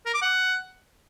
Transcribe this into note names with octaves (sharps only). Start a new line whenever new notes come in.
A#4
D6
F#5